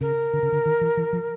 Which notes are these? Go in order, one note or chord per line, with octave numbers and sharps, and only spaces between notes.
C#3 A#4
D3
C#3
D3
D#3
E3
E3
F3